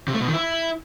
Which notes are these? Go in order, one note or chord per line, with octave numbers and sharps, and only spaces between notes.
C3
A3
B2
D#3
E4